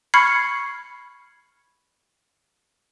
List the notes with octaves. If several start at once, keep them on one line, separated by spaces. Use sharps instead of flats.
B5 C#6 F6 G#6 C7 C#7